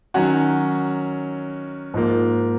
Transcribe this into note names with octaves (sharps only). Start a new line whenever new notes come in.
D#3 F#3 C#4 F#4
G#2 F3 A#3